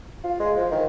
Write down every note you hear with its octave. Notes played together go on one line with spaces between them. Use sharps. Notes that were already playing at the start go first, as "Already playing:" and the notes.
F4
G#3
F3
D#3